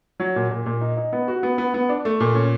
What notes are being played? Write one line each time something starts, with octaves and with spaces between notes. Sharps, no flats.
F#3
A#2
A#2
A#2
D#4
D#4
B3
F#4
B3
B3
B3
D4
A3
A#2
C#4